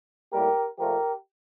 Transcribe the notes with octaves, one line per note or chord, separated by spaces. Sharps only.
A2 G3 A#3 G4 A#4
A#2 F3 A3 G4 A#4